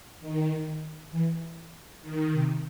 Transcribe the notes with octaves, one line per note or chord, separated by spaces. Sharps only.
D#3
E3
D#3
C3